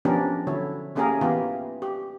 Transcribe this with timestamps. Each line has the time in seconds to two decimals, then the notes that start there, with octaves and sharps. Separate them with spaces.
0.05 F3 B3 C#4 D4 G4 A#4
0.47 D3 F#3 E4 C#5
0.95 A3 A#3 C#4 G4 G#4 A#4
1.21 E3 B3 F4 G4
1.82 G4